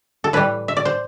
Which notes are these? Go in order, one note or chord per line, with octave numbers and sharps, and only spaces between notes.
A4
A2 E3 G3 B4
E5
D5
C5